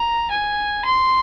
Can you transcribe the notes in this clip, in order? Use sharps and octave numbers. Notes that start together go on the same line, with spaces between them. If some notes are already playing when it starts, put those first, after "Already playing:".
Already playing: A#5
G#5
C6